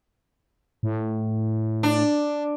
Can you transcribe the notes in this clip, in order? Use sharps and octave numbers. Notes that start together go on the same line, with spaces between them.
A2
D4